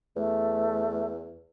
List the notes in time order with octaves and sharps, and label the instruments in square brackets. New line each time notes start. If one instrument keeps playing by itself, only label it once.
[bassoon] E2 [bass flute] A3